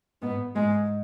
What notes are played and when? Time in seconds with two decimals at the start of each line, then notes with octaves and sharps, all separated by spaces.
0.22 G#2 B3
0.56 G#2 G#3